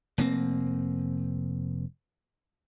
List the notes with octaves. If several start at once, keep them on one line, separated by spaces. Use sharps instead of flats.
F1 A#3 C4